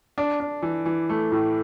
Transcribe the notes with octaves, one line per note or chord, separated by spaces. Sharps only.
D4
D4
E3
E3
A3
A2